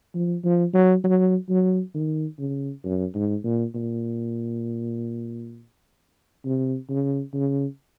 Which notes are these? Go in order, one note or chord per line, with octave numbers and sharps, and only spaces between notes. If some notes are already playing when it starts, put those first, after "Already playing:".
F3
F3
F#3
F#3
F#3
D#3
C#3
F#2
G#2
A#2
A#2
C3
C#3
C#3